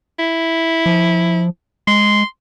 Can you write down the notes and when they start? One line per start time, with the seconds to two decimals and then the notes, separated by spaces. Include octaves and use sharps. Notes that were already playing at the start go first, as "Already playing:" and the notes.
0.19 E4
0.86 F3
1.87 G#3 C6